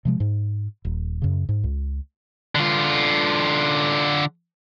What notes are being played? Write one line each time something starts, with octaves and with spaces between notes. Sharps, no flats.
C3 F3 G#3
G#2
D#1
F#2 C#3
G#2
C#2
D3 F4